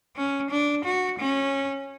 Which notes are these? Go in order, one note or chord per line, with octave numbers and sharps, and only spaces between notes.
C#4
D4
F#4
C#4